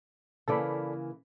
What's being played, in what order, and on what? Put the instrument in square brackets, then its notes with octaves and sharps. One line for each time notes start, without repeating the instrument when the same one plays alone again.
[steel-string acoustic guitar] C#3 E3 A#3 [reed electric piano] A4 D5 B5